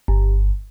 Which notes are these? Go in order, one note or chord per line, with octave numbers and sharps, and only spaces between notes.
G1